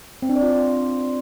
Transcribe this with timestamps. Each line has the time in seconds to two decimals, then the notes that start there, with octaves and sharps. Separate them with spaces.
0.22 C4
0.29 D4
0.36 D5
0.43 F4